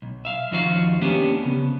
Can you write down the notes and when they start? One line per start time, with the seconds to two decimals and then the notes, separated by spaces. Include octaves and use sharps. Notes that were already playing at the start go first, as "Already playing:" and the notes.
0.02 B1
0.25 E5 F5
0.51 D#2 F3 D#4 F#4 A#4 F5
1.01 A#3 B3 C#4 D4 G4
1.43 C#3 B3